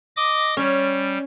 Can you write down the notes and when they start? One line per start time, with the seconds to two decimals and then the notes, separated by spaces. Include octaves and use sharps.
0.17 D#5 D6 D#6
0.57 G3 C#4